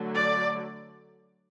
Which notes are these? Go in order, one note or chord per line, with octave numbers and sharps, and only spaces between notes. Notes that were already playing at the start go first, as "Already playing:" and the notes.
Already playing: D3 F#3 A3
D5